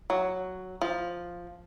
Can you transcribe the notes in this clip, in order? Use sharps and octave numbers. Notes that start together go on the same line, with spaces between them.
F#3
F3